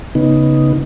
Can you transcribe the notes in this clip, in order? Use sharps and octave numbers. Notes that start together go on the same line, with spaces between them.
C#3 B3 D#4